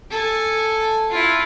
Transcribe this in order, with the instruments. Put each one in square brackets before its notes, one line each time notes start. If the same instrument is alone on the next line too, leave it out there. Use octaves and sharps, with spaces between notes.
[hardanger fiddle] A4 G#5
E4 F4